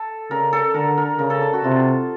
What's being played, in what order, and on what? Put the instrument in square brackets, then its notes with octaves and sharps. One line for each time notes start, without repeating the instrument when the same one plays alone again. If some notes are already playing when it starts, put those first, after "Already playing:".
Already playing: [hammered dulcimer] A4
[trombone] C#3 [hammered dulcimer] A#4
[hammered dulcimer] A4
[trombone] D3 [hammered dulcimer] A#4
[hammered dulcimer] A#4
[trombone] C#3 [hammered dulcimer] A#4
[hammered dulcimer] A4
A4
F#4
[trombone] C3 [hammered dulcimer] F4